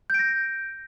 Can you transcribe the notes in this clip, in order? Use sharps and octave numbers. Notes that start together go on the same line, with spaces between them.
G6 A#6 D7